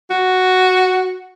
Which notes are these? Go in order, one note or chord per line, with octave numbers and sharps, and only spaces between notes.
F#4